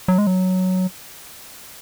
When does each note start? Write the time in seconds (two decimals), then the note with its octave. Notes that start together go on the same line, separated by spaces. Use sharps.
0.08 F#3
0.18 G#3
0.27 F#3